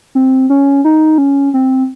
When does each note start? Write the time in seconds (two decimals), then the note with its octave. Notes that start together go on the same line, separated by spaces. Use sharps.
0.15 C4
0.50 C#4
0.84 D#4
1.18 C#4
1.54 C4